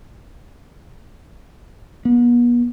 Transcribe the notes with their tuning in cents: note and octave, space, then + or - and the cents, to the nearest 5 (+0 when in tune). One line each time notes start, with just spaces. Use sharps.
B3 -40